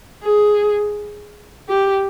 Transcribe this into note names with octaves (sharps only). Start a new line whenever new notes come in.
G#4
G4